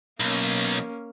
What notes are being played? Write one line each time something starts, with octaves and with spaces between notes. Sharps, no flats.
B1 A#3 C#4